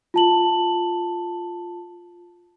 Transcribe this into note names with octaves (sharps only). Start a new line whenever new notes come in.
F4 A5 F#7